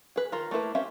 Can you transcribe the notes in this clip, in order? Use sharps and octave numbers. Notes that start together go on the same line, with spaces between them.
G#4 B4
D#3 F4 A#4
A3 A#3 E4 B4
C4 C#4 G4 E5 F5